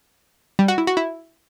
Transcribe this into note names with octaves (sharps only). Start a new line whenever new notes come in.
G3
F#4
E4
F#4
E4